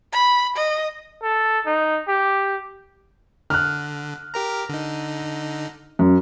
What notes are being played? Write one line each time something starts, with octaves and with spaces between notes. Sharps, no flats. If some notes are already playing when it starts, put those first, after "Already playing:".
B5
D#5
A4
D#4
G4
D3 F6 F#6
G4 A#4 A#5
D3 D#4
F#2